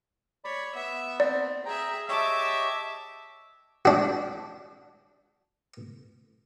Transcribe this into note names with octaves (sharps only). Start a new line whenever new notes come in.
C#5 D5 B5
B3 E5
C4 D5
G#4 E5 G5 A#5
G4 C#5 D#5 E5 A5 D6
D4 F#4